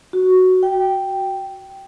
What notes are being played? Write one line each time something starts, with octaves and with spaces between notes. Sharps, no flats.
F#4
G5